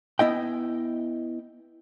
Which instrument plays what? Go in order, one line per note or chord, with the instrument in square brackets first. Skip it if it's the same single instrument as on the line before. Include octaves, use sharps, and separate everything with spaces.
[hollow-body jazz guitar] B3 E4 D#5 G5